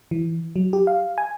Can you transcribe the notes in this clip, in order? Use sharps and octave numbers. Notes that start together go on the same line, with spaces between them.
E3
F#3
G4
F5
G#5